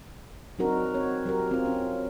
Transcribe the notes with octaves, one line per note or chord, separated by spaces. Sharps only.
F#3 C4 D4 D#4 F#4 A#4
C4 C#5
F#3 G4 A#4
C4 F4
C#4